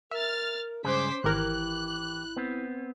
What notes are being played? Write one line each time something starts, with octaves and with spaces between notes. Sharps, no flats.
A#4 E5 F6 A6
C#2 G2 C#4 G#4 C5 D6 B6
G#1 E3 E4 G4 A#4 F6 F#6
B3 C4